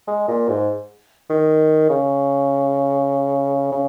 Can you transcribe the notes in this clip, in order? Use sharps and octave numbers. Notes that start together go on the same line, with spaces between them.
G#3
A#2
G#2
D#3
C#3
C#3